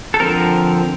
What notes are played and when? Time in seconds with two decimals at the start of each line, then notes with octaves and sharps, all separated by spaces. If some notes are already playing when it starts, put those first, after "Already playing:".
0.14 A4
0.20 D3 F3 C4 A#4